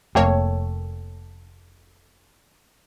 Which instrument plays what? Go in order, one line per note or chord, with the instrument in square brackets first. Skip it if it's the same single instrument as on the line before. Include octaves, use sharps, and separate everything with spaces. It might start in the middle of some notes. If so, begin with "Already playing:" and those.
[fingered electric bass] F1 A3 [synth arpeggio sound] F2 A#3 C#5 [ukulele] A4 G5 A5